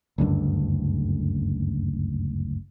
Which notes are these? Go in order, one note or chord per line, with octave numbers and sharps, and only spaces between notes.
F#1 D2 G2 D3